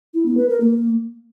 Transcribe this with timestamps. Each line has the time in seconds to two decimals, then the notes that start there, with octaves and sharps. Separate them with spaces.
0.14 E4
0.26 B3
0.37 B4
0.49 A#4
0.61 A#3